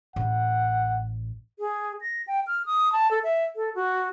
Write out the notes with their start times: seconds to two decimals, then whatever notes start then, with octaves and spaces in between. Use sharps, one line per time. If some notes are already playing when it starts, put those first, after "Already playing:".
0.16 A1 F#5
1.59 G#4
2.01 A#6
2.27 G5
2.47 F6
2.66 D#6
2.93 A5
3.11 A4
3.24 E5
3.56 A4
3.75 F#4